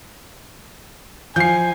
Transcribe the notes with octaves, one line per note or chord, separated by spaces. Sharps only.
F3 G#5 G6 C7